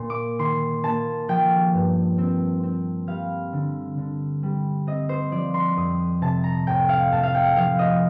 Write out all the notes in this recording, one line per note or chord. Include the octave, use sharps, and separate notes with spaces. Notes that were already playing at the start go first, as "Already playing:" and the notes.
Already playing: A#2 C6
D6
D#3 C6
A#3 A5
F3 G5
G2
C4
C4
G3 F5
D3
D3
G3
C4 D#5
C5
F3 D5
C6
F2 D#6
C3 A5
A#5
A2 G5
F5
A2 A5
F5
G5
F3 F5
D#5